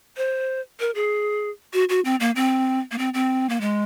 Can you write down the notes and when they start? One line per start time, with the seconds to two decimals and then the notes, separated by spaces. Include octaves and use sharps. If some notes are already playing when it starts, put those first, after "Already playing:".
0.17 C5
0.80 A#4
0.95 G#4
1.73 F#4
1.89 F#4
2.05 C4
2.20 A#3
2.36 C4
2.91 A#3
2.98 C4
3.14 C4
3.50 A#3
3.61 G#3